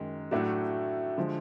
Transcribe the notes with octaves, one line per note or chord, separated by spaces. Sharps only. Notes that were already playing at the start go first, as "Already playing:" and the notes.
Already playing: F#2 D#3 G#3
A2 F#3 A3 D4 F#4
D3 F3 G#3